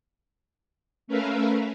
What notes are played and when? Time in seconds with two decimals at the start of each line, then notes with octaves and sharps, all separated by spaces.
1.07 A3 C#4 A#4 B4 E5 F5